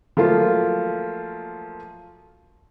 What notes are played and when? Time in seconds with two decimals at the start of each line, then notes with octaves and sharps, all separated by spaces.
0.17 F3 F#3 A3 A#3 F4